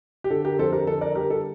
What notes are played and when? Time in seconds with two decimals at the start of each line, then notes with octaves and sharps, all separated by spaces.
0.24 G4
0.30 D3 A4
0.45 G4 A#4
0.59 F2 A4 C5
0.72 G4 A#4
0.87 D3 A4
1.01 A#4 D5
1.15 G3 G4 A#4
1.30 A4